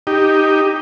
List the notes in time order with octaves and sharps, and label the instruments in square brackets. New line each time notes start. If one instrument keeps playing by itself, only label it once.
[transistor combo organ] D#4 G4